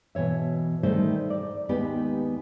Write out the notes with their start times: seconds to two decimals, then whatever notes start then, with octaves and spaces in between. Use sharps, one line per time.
0.15 B2 E3 C#5 E5
0.83 D#3 G3 A3 G#4 C5
1.30 D5
1.69 D#2 G#3 B3 D#4 G4